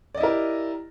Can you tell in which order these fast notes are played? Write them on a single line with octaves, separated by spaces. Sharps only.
D5 D#5 E4 A#4 G4